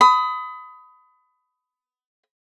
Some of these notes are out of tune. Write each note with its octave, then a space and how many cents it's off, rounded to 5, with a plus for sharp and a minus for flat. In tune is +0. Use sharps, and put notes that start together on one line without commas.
B5 +25 D#6 +15